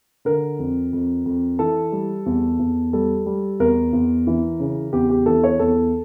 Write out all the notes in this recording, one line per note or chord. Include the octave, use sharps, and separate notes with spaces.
D3 A#4
F2
F2
F2
E3 A4
G3
E2
E2
G3 A4
G3
E2 A#4
E2
E3
C#3
E2 G4
G4
E3 A4
C#5
E2 A4